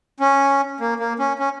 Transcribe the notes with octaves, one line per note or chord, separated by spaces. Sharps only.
C#4
A#3
A#3
C#4
C#4